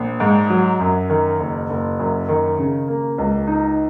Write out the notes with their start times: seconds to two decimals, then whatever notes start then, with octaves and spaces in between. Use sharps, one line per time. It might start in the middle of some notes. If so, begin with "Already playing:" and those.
Already playing: A#1
0.20 G#2
0.50 F#3
0.80 F#2
1.10 D#3
1.39 F#1
1.70 F#1
1.99 F#2
2.28 D#3
2.59 C#3
2.88 A#3
3.18 C#2
3.47 D#4